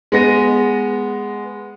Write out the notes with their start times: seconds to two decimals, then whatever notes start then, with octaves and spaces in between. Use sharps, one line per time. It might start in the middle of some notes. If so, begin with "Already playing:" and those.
0.12 G#3 B3 A#6 D#7